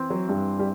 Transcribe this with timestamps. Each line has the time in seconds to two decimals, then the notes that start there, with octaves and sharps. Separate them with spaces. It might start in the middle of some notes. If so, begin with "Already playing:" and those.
Already playing: E3 C4
0.10 F#3
0.28 G2 G3
0.59 G3